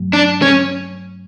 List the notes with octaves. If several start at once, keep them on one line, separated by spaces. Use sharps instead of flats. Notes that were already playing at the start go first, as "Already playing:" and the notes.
Already playing: G2 F#3 A3
D4
C#4